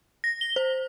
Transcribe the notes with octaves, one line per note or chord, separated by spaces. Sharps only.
A#6
G7
C5